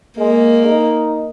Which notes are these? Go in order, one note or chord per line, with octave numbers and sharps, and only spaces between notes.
G#3 A#3
D#4